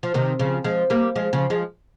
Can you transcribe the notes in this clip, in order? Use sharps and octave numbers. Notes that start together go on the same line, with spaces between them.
F3
C3 D#3
C#3 F3
F3 G#3
G3 A#3
F3 G#3
C#3 F3
F3 G#3